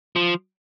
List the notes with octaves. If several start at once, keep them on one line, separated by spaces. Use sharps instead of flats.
F3